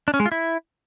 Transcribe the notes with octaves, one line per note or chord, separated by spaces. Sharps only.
D4
C#4
G#3
F4
E4